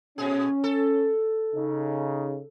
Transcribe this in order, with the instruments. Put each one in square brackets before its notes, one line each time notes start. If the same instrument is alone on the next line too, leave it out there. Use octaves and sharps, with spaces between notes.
[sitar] A#2 G#4 [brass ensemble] C#4
[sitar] A4
[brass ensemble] C#3 D#4